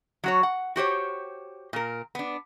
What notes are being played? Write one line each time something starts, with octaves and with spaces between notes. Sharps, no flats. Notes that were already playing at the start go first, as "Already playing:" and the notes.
F#3 F#4 C#5
F#5
F#4 G4 C5 C#5
A#2 A#4
B3 D4